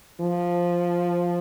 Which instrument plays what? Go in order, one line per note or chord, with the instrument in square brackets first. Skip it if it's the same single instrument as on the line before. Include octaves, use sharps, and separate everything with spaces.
[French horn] F3